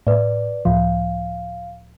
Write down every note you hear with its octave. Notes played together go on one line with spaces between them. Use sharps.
A2 B4 D5
C#2 A2 F3 F5